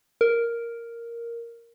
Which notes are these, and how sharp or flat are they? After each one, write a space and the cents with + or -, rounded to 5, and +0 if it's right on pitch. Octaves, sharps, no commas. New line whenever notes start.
A#4 +0